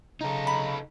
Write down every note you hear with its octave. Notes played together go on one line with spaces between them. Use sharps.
C#3 D#4 A4 A#5
B5